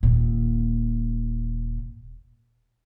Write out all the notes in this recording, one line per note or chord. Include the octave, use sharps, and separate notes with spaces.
D#1 A#2